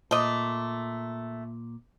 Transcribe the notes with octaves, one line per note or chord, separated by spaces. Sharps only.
A#2 A3 D#5